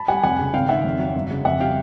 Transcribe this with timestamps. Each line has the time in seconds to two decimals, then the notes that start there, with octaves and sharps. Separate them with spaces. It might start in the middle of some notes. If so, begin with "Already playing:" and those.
Already playing: A5 B5
0.08 G3 F#5 G#5
0.23 F1 F#5 G#5
0.39 C#3
0.53 G#1 F5 G5
0.69 D#3 E5 F#5
0.84 F2
0.99 F#3
1.15 G1
1.30 C#3
1.45 F2 E5 F#5
1.60 G3 F5 G5